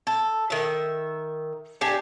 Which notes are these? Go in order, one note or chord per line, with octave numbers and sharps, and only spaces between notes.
A4
D#3 E5
D4 G4 G#5